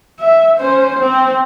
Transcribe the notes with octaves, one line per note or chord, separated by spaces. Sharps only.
E5
C#4 C5
C4